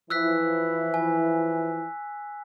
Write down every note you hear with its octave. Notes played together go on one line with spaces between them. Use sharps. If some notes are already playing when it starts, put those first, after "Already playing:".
E3 F3 E4 E6 F#6 B6
G#5